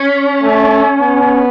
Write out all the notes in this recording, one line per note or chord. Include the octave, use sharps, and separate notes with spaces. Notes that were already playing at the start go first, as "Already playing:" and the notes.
Already playing: C#4
A3
B3